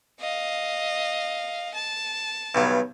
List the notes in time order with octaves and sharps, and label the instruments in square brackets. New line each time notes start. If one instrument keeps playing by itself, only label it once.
[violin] D#5 F5
A5
[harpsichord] B1 G2 F#3